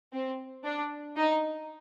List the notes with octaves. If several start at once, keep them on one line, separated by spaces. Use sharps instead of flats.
C4
D4
D#4